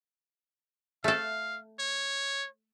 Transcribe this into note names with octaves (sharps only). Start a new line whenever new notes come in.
A3 A4 F5
C#5